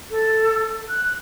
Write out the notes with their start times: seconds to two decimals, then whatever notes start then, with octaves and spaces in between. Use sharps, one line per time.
0.10 A4
0.90 F#6